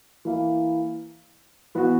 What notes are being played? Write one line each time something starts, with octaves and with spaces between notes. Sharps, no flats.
E3 A#3 E4
E3 B3 F#4